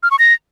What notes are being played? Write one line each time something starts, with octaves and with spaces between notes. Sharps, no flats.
F6
C#6
A#6